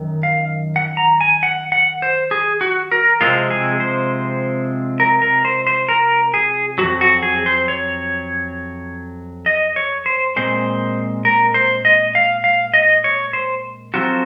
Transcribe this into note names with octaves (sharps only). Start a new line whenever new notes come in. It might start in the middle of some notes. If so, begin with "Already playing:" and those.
Already playing: F#2 D#3
F5
F#5
A#5
G#5
F#5
F#5
C5
G#4
F#4
A#4
C3 F3 G#3 C4 F4
G#4
C5
A#4
A#4
C5
C5
A#4
G#4
F2 D#3 F#3 F#4
F#4
G#4
C5
C#5
D#5
C#5
C5
A#2 G#3 C4 C5
A#4
C5
D#5
F5
F5
D#5
C#5
C5
F2 C#3 F#3 C4 F4 F#4